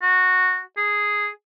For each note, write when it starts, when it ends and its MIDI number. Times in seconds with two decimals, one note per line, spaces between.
0.02 0.61 66
0.77 1.28 68